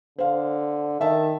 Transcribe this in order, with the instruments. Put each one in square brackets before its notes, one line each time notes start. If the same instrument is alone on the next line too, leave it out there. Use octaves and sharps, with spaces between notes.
[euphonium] D3 [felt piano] C5 F5
[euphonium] D#3 [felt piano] E5 A5